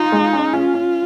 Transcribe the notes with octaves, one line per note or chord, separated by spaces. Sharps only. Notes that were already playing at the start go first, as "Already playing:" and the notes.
Already playing: D#4 F4
G#3
C#4
C#4 F4
C#4